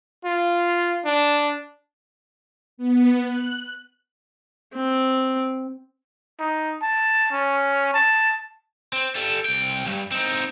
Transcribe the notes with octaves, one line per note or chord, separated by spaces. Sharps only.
F4
D4
B3
F#6
C4
D#4
A5
C#4
A5
C4
G3 A4
C2 G5
C#2 G2
C4 D#4